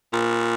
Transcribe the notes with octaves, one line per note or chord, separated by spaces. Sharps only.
A#2